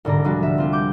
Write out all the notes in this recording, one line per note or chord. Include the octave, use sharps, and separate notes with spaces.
C2 G#2 D3 D5 A#5
F3 G3 G#3 D4 F#4
E5
C4 F4 G4
D6 G6